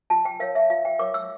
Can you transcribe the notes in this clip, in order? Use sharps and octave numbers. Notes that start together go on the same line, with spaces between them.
F4 A5
G5
A#4 C#5 F5
E5
F4 F5
G5
A#4 C#5 D6
E6